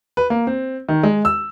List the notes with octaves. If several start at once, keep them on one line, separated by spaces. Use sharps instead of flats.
B4
A#3
C4
D#3
G#3
E6